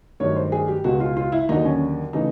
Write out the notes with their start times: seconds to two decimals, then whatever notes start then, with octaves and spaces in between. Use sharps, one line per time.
0.20 G2 D#3 F#3 A3 C#5
0.36 C5
0.52 G#4
0.68 G4
0.84 C#2 B2 G#3 F#4
1.00 F4
1.17 F4
1.32 E4
1.49 D#2 D3 F#3 D#4
1.65 C#4
2.13 C#3 E3 A3 D#4